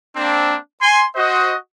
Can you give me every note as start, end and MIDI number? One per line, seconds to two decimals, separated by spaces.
0.16 0.56 58
0.16 0.56 60
0.16 0.56 62
0.82 1.04 80
0.82 1.04 84
1.16 1.54 66
1.16 1.54 72
1.16 1.54 75